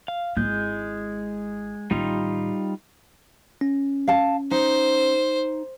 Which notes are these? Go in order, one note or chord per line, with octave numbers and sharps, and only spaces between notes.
F5
G#1 G#3 E4 G6
A1 D#3 G3 D#4 F4
C#4
F5 A5
D#4 C5